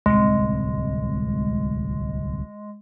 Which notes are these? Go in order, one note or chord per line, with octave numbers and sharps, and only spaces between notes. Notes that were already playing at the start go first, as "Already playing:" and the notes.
D1 C2 C3 G#3